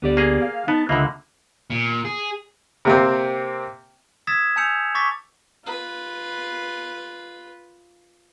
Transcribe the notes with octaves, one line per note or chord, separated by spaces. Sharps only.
D2 B3 G4 D5
A#3 G#4
F5
B3 D#4 A5
C#2 D3 A#3 F4 D#5 E5 B5
A#2
G#4
C3 A#3 C4
D#6 E6 G#6 A6 B6 E7
G#5 A5 E6 G6 C#7 F7
C#6 D6 A6 B6
F4 B4